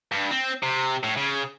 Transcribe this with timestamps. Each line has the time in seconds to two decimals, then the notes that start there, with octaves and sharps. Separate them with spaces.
0.12 G2
0.31 C4
0.63 C3
1.03 A2
1.17 C#3